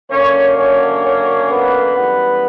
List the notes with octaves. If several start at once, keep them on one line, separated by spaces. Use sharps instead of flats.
F#2 D3 A#3 C#4 C#5
C#4 C#5
C#4 C#5
B3 B4
F#2 E3 G3 B3